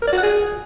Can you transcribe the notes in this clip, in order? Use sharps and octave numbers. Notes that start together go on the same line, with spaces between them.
A#4
D5
F#4
F#5
G#4